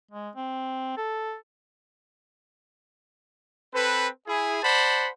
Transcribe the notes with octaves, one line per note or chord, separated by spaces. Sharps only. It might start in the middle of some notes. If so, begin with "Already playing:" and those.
G#3
C4
A4
C4 A4 B4
E4 G#4
C5 D5 F#5 A5 B5